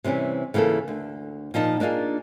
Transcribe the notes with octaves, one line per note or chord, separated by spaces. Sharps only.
C3 E3 G3 C#4
C#3 E3 A#3 F4 A4
D2
A#2 F3 D#4 A5
A#3 D4 D#4 F4 G#4